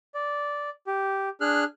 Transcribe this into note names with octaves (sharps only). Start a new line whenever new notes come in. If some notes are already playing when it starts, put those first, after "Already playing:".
D5
G4
D4 G#4 F6 F#6